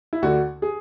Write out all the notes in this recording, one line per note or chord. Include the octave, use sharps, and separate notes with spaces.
E4
D2 D3 F#4
G#4